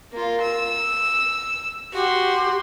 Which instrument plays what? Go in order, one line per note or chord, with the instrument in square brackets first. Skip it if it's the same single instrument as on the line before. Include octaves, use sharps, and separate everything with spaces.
[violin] A#3 F4
E6
[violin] F#4 C6 [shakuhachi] G4